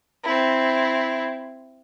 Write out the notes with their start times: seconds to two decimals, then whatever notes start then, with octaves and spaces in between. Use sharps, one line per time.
0.24 C4 E4